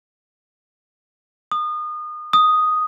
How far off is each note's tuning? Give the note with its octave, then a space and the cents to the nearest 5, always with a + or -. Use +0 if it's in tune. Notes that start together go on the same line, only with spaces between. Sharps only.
D#6 -30
D#6 +0